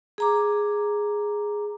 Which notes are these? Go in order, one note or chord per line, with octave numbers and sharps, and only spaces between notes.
G#4 A#5 D6